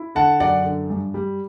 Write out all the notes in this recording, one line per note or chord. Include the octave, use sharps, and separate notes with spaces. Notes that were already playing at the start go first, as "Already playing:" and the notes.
Already playing: E4
D3 F#5 A5
F#2 D5 F#5
D3
G2
G3